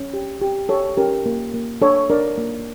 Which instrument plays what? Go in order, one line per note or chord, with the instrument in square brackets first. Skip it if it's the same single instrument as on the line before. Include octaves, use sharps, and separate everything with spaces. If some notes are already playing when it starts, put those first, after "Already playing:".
Already playing: [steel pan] C#4
G4
G4
G4 A4 C#5
C#4 G4 A#4
A#3
A#3
D4 A4 C#5
D4 A#4 D5
A#3